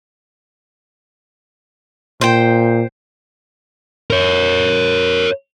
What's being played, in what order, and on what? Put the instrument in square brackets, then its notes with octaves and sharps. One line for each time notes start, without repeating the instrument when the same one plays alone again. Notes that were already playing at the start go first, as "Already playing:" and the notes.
[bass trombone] A#2 [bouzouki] C5 G5
[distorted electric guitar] A#4 C#5